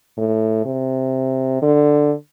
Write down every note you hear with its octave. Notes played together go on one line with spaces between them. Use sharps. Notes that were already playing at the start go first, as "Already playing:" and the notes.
A2
C3
D3